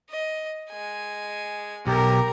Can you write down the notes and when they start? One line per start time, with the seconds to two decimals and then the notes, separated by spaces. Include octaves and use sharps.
0.10 D#5
0.70 G#3 G#5
1.87 B1 G4 A#4 A#5